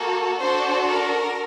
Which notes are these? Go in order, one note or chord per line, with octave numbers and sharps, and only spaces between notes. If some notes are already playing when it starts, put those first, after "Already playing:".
Already playing: A#3 F#4 A4
D4 F#4 A4 C5
A#4